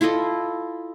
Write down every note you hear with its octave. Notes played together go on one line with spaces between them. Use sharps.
E4 F4 A4 D#5